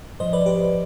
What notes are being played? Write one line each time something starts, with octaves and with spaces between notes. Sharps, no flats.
G#2 F3 C5 D#5
B4 D5
G4 B4